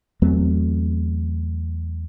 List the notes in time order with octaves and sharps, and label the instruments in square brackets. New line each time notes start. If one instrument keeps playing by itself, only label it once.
[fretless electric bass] E2 F#3 A3 C4